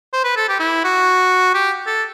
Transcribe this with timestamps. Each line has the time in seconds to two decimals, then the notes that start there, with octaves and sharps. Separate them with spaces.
0.13 C5
0.24 B4
0.36 A4
0.49 G4
0.59 E4
0.84 F#4
1.54 G4
1.86 A4